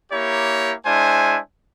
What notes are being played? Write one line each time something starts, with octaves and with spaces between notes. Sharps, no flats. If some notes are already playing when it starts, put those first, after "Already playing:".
A#3 E4 G4 C#5 A#5
G#3 D4 E4 C5 G#5